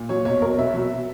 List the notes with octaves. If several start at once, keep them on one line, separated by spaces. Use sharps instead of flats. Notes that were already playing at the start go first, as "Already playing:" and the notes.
Already playing: A#2
F#3 C#5
B1 C#5
B1 A#4
B2 E5
F#3